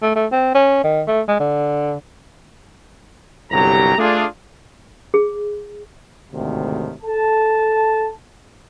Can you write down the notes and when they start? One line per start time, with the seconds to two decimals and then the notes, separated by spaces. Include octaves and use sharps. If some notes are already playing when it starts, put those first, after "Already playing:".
0.02 A3
0.16 A3
0.32 C4
0.54 C#4
0.84 D#3
1.07 A3
1.28 G#3
1.39 D3
3.51 G1 C2 C#3 F#3 G4 A#5
3.98 A3 D4 F4 G#4
5.14 G#4
6.32 G#1 D2 A2 C3 D#3
7.03 A4 A5